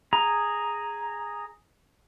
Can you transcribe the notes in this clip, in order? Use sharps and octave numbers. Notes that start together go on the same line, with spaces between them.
G#4 A#5